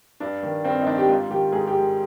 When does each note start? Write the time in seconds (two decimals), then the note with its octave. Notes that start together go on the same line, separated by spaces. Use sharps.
0.20 G2 D4
0.43 D#3
0.64 G2 C4
0.81 D#4
0.87 D#3 D4
0.98 G4
1.08 G#2 F4
1.30 D#3 G4
1.52 G#2 G#4
1.67 G4
1.75 D#3